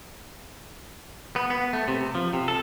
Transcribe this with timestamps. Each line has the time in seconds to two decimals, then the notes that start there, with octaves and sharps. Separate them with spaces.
1.36 B3
1.50 B3
1.73 A3
1.88 C3
2.15 F3
2.33 C3
2.48 A4